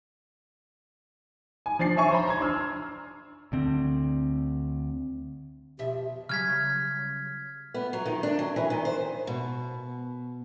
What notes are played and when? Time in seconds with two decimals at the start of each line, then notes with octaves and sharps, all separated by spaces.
1.66 G#5
1.79 F3 D4 A6 C7
1.97 C#5 E5 G#5 C#6
2.11 C5 A#5 B5
2.27 A#5 C6 G#6
2.40 D4 E6 F6
3.52 D2 D3 C4
5.79 F2 B2 G4 E5
6.29 C#3 F#3 G3 F6 G#6 B6
7.74 B3
7.93 F#3
8.06 D#3
8.23 D4
8.39 F#3
8.56 E3
8.70 D#3
8.85 C5
9.27 B2